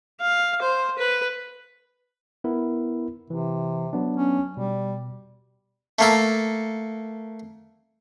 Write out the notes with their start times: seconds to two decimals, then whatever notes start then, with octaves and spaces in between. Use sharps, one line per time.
0.21 F5
0.62 C5
0.98 B4
2.44 B3 E4 A#4
3.30 C3 E3
3.93 F#3 B3 D4
4.17 C#4
4.57 B2 G3
5.99 A3 A#3 A4